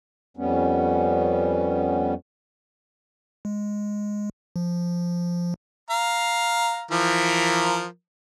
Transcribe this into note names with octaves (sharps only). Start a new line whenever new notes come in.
F2 G3 B3 C#4
G#3
F3
F5 A#5
E3 F3 A#4